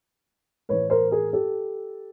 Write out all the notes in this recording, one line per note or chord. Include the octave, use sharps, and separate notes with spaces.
A2 E3 B4 C#5
A#4 C5
G#4 A#4
G4 A4